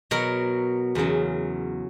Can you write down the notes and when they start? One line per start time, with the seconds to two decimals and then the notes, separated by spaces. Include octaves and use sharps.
0.11 B2 F#3 A#4
0.95 E2 C#3 F#3